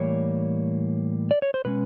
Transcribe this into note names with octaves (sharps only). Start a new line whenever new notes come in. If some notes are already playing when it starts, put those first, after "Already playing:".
Already playing: A2 E3 G3 A#3 C#5
D5
C#5
C5
B2 G#3 C#4 B4